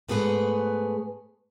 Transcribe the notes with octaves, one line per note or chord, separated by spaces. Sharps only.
G#2 A3 B3 G#4 B4